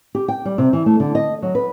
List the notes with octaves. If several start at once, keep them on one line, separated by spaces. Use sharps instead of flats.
G4
G5
G3
C3
E3
A3
D3
D#5
F#3
B4